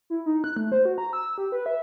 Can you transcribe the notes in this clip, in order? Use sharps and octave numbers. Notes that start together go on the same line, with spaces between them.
E4
D#4
F#6
A3
C5
F#4
A#5
E6
G4
B4
E5